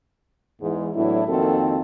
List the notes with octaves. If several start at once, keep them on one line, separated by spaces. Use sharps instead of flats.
E2 G#2
A2 F#3 B3 D4 E4
F2 D#3 A#3 C4 F#4 A4